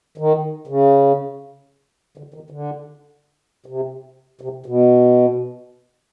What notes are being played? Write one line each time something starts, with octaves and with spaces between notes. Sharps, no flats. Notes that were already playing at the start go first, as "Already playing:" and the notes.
D#3
C#3
D3
D#3
D3
C3
C3
B2